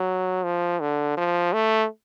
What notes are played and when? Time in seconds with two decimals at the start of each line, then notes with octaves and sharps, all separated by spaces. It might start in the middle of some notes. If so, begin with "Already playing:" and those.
Already playing: F#3
0.44 F3
0.80 D3
1.17 F3
1.53 A3